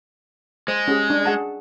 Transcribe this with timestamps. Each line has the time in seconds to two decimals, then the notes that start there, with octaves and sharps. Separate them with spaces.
0.68 G#3 C5
0.88 C#4 G4 G#4
1.10 D4
1.25 G#4 F#5 A5